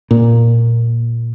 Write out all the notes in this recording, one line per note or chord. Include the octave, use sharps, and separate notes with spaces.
A#2